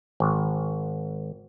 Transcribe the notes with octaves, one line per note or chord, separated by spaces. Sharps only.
G#1